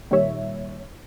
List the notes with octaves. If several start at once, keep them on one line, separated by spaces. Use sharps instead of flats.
A#2 D#3 G3 C#5 E5